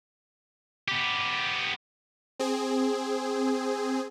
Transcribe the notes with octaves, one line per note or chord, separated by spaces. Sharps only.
B3 G4
C4 G#4